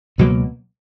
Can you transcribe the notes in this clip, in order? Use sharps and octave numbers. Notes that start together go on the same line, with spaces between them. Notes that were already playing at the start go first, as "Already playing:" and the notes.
C#2 B2 F#3 A#3